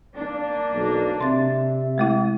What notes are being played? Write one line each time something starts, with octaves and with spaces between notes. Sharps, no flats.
A#3 D4
B1
C3 E5 C6 A6
G#3 A3 E4